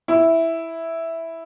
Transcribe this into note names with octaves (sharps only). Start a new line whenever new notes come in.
E4